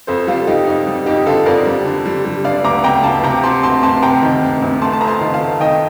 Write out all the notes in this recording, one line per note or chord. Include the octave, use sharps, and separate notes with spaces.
F2 A4 C5
G3 F4 A4
G3 D#4 G4
F2 D#4
G3
F2 D#4 G4
D3 F4 A4
F2 A#4 D5
G3
D3
G3
G3
D3 D5 F5
D2 A#5 D6
D2 G5 A#5
D2 F5 A5
C3 G5 A#5
C3 A5 C6
D2 A5 C6
D2 A5 C6
C3 G5 A#5
D#3
D2
D2
A3 A5 C6
A5
F2 A#5
A5 C6
D#3
F5 A5
A3
D#3 D#5 G5